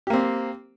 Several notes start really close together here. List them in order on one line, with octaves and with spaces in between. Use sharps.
G4 A#3 C4